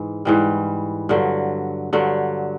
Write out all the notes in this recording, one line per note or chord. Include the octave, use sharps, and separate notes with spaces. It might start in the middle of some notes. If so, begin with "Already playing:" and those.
Already playing: G#2 E3
G#2 E3 G3
G2 D3 F#3
G2 D3 F#3